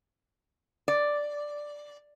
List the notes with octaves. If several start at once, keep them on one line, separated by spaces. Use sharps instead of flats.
D5